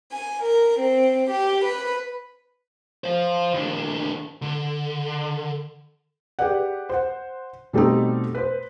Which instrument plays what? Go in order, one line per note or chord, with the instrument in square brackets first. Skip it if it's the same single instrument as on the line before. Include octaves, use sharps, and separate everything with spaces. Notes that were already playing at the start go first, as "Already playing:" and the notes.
[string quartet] G#5
A#4
C4
G4
B4
[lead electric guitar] C5 F5
D#2 D4
D3
[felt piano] G4 G#4 B4 D5 F#5
C5 F#5
B2 G3 A3 C4 D#4
B4 C5